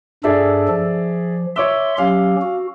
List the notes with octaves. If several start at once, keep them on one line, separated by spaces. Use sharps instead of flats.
G2 D4 G#4 A4 D5 E5
F3
C#5 E5 C6 D6 E6
F#3 C#4 G4 F5
F#4